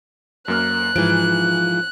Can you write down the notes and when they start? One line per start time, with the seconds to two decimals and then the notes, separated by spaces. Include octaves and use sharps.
0.48 F#2 A#3 F6 F#6
0.96 G#2 E3 F3 D7